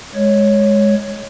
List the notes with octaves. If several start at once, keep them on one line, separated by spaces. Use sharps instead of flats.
G#3 C#5